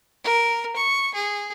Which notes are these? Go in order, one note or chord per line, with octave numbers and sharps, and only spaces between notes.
A#4
C#6
G#4